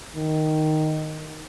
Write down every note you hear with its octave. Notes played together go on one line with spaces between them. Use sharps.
D#3